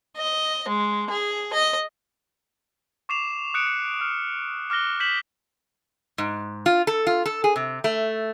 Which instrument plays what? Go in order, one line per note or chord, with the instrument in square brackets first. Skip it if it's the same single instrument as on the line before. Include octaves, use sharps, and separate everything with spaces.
[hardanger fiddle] D#5
G#3
G#4
D#5
[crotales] C#6 D6 C7 E7 F7
D#6 F#6 C#7 D7
C#7
F6
D6 F6 F#6 A#6 G7
G6 B6 E7 F#7
[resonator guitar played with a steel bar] G#2
F4
A4
F4
A4
G#4
C3
A3